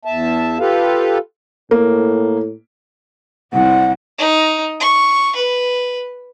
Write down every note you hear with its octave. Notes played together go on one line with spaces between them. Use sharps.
E2 E5 A5
F4 G4 A4 B4 F5
A2 A#3
C2 F#5
D#4
C#6
B4